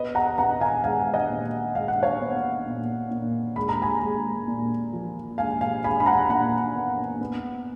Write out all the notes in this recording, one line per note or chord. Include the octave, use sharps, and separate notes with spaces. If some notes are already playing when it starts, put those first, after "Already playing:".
Already playing: B3 B4 D#5
F#5 A#5
B3 F#5 A#5
F5 G#5
G#3 F5 G#5
D#5 F#5
A#2
G#3 F5
F#5
C#5 F5
B3
A#2
A#2
G#3 B5
A#5
G#5 B5
G#3
A#2
F3
G#3 F5 G#5
F5 G#5
G#3 G#5 B5
B5
F#5 A#5
A#2 F#5 A#5
B3
B3